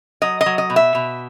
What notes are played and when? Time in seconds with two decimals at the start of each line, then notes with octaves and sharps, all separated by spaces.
0.22 F#3 D#5
0.41 D#5
0.46 F#3
0.58 D#5
0.70 B2
0.76 E5
0.95 B2